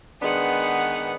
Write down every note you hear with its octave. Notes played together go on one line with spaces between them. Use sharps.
D#3 G#3 B3 D4 G#4 F#5